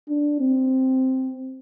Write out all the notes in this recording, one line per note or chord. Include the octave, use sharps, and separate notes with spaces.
D4
C4